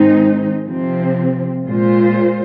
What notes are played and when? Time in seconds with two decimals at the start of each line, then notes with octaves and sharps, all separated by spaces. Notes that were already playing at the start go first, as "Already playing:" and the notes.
Already playing: G#2 D#3 G#3 C4 D#4
0.66 C3 F3 C4
1.65 A#2 G#3 F4 C5